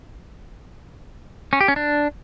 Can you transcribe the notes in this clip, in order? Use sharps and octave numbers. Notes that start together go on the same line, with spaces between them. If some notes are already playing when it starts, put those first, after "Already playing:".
C#4
G4
C#4
D4